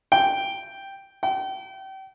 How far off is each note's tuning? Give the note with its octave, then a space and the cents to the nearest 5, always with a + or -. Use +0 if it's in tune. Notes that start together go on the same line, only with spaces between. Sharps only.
G5 +0
G5 -35